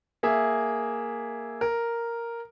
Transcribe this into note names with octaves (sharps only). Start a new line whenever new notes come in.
A#3 G#4 E5
A#4